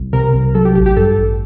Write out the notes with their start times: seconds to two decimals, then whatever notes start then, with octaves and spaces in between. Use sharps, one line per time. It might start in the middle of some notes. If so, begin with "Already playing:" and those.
Already playing: C2
0.13 C3 A#4
0.34 C2
0.55 F#3 A4
0.65 G4
0.75 A1 G4
0.86 G4
0.97 G2 A4
1.17 A1